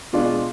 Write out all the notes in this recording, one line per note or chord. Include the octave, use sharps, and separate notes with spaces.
B2 G#3 D4 F4